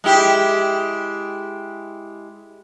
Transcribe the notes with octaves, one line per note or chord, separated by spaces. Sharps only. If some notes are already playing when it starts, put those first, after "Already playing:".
G#3 E4 G4